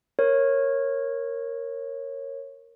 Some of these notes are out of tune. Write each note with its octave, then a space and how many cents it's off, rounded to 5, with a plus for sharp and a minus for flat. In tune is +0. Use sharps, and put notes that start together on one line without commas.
A#4 +0 C#5 -15